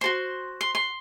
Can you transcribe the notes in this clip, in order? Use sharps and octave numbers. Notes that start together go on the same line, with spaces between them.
F#4 A4 C5 C6
C6
C6